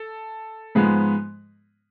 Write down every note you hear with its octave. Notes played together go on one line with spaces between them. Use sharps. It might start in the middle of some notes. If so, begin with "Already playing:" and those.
Already playing: A4
G#2 F3 G#3 B3